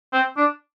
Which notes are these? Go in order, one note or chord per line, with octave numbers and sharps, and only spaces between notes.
C4
D4